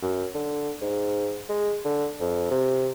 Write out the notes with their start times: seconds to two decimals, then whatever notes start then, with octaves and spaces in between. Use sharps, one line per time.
0.02 F#2
0.34 D3
0.82 G#2
1.49 G#3
1.85 D3
2.21 F2
2.51 C3